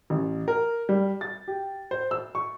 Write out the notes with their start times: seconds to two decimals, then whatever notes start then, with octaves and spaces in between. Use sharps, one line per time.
0.10 A1
0.48 A#4
0.89 G3
1.21 A6
1.48 G4
1.91 C5
2.11 E6
2.35 C#6